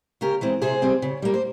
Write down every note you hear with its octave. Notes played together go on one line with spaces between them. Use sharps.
C#3 G4 A#4
E3 G#3 C4
C3 G#4 C5
G3 C4
C#3
G3 A#3
C5